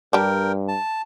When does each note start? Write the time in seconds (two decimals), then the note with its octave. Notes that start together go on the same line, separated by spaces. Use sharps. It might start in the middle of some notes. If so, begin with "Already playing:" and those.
0.13 G2 G3 D4 A#4 G5
0.68 A5